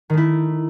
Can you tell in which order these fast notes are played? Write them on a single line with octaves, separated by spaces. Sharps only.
D#3 A3 E4